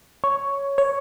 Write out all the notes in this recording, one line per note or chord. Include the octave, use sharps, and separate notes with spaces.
C#5
C#5